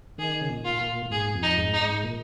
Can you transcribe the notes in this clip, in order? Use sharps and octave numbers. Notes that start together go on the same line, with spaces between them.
D#3 G#4
C#3
A#2
F4
A#2
A#2
G#2 G#4
F2
D#4
G#2
D#4
G#2
A#2